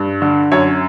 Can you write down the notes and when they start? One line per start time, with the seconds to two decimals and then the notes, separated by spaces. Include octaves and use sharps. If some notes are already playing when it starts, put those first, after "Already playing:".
Already playing: G2
0.22 D3
0.52 F#2 C#5